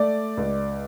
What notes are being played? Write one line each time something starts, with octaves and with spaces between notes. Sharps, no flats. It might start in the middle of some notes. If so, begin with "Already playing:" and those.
Already playing: A3 D5
C#2